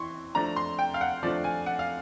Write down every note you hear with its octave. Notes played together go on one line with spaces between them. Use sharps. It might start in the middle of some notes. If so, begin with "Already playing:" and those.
Already playing: E3 C4 C6 C#6
F3 A3 D4 A#5
C6
G5
F5
F#5
F3 A3 D4 D5
G#5
F#5
F5